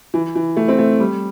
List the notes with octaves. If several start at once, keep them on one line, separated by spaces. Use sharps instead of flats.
E3
E3
A3
C4
A3
G3